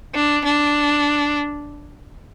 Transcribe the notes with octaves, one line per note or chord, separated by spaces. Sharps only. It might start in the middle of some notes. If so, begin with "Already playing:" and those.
D4
D4